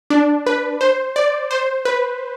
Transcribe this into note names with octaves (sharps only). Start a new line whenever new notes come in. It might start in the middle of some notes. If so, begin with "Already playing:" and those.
D4
B4
C5
D5
C5
B4